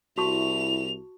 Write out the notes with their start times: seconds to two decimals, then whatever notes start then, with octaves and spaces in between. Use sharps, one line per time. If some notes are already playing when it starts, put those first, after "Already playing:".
0.18 C2 E4 F#4 A5 C#6 F7